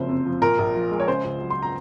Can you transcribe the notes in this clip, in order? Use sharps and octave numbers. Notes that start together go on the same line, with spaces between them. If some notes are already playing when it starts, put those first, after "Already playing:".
Already playing: F#1 F2 C5
C3
F3
A#2 A#4
A#1
F3
G#3
C#5
C#3 C5
C#2
F#3
C6
A#5